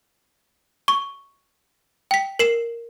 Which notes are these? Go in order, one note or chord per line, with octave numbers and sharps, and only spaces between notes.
C#6
G5 B6
A#4 C7 E7